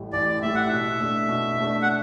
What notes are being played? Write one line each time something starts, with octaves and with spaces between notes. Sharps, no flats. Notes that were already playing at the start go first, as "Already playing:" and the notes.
Already playing: A1 A2 G3
A1 D5
A2 G3 E5
F#5
B2 E5
A3 D4
B2
A3 D4
F#5